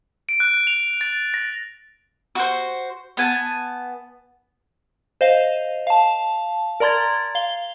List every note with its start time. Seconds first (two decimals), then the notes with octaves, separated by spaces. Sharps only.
0.29 D7
0.40 F#6
0.67 F7
1.01 A6
1.34 A#6
2.35 F#4 C5
3.17 B3 G#5 A5
5.21 C5 D#5 F5
5.87 F5 A5
6.80 A#4 D5 A#5 C6 G#6 A6
7.35 F5 G7